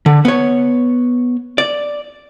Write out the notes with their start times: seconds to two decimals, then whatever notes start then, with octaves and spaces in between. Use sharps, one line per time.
0.06 D3
0.25 B3 C#5
1.58 D5